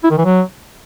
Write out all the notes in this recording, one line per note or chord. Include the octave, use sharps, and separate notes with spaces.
E4
D#3
E3
F#3